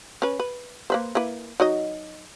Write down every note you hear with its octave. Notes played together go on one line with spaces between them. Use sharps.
C#4 B4
B4
A#3 B4 C5
A#3 E4 B4
F#3 D#4 D#5